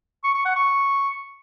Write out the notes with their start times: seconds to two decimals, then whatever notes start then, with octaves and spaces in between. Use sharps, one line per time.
0.24 C#6
0.35 C#6
0.45 F#5
0.56 C#6